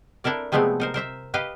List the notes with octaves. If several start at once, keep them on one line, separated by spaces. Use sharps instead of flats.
D4 E4 A4 A#4 D5
C3 F3 G#3 A3 B3 C4
D#4 A#4 C5
A#4 C5 E5 A#5
G4 B4 D#5 F5